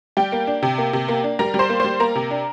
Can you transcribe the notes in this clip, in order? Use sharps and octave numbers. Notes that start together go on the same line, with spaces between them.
G3 G4 G5
A#3
D4
C3
A#3
C3
A#3
D4
G3 A#4 A#5
G3
C5 C6
A#3
G3 C5 C6
A#3 A#4 A#5
C3
D4